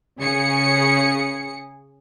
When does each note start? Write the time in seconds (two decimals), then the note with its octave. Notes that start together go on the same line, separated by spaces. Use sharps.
0.18 C#3 G#4 C#7